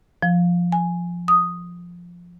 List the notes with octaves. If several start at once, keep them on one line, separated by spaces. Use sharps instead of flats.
F3
G#5
D#6